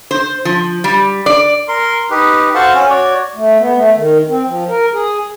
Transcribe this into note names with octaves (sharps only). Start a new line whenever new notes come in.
C5
F3
G3
D5
A#4 C6
D#4 G4 B4
F#4 A4 C5 F5 F#5 A5
C#4
F#4 C#5 D5
A3
B3
A3
D#3
C4
F3
A#4
G#4